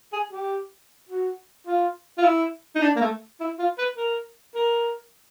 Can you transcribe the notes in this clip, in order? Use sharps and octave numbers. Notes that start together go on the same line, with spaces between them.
G#4
G4
F#4
F4
F4
E4
D#4
D4
A#3
A3
E4
F4
B4
A#4
A#4